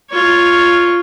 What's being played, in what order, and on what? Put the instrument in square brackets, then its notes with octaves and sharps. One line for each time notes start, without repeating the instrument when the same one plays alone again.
[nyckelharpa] F4 C#5